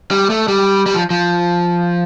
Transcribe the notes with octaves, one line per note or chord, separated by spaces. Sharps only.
G3
A3
G3
G3
F3
F3